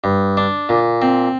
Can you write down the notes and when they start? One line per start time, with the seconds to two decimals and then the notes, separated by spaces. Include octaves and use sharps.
0.04 G2
0.37 D4
0.69 A#2
1.02 C4